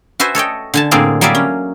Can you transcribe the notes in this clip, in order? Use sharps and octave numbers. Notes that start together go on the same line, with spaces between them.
F#4 B4 C5 E5 G#5
A4 C#5 D#5 G5
D3 G#5 A5
A2 D3 A#3 C4 G#4 D5
F#3 G3 A#3 G#4 D5 E5
C#4